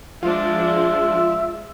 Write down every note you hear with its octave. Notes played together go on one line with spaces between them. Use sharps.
F3 G#3 D4 F4 E5